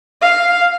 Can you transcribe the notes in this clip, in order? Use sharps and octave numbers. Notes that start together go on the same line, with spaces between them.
F5